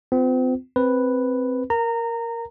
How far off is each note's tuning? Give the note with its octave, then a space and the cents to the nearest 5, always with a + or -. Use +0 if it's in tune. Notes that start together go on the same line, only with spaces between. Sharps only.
C4 -40 F4 +10
C4 +0 B4 +0
A#4 +0 A#5 -20